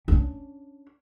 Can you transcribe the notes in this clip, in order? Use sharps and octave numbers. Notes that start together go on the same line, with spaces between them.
C#4 D4